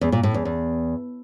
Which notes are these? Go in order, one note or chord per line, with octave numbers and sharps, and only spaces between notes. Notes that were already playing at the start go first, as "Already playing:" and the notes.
E2
A#2
A2
E2
E2